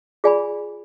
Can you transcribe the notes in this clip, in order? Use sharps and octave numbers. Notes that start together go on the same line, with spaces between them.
F4 G#4 D5 G#5 B5